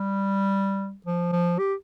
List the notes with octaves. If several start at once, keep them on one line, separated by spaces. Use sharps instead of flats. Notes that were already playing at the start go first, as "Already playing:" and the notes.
Already playing: G3
F3
F3
G4